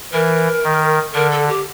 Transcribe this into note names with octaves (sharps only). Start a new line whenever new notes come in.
E3 A#4
D#3
D3 A#4
A4
G4